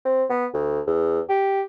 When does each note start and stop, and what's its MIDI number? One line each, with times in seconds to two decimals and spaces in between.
0.05 0.24 60
0.29 0.46 59
0.53 0.80 38
0.87 1.20 40
1.29 1.62 67